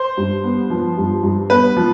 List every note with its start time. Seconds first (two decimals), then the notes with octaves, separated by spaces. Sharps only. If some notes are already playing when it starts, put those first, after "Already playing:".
Already playing: C5
0.17 G2
0.44 B3
0.70 F3
0.98 G2
1.23 G2
1.50 B3 B4
1.77 F3